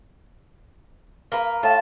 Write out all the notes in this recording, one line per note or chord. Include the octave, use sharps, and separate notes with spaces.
A#3 A#4 B4
A2 F4 A5